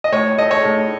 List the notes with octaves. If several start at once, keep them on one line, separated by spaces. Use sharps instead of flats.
D#5
A2 C#5
A3 D#5
C#5
A2